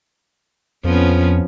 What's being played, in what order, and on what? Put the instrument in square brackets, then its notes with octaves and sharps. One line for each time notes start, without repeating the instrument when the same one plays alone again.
[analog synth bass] F2 [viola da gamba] F3 B3 C#4